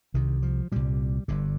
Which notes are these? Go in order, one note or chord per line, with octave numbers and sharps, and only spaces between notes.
C2 C3 D#3
F3
C2 A#2 G3
G1 G2 D3